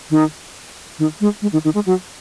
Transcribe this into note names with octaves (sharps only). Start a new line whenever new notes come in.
D#3
D#3
G#3
G#3
D#3
D#3
G#3
F#3